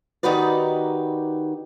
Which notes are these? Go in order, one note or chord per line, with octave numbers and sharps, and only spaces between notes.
D#3 D#4 F#4 G4 B4 D5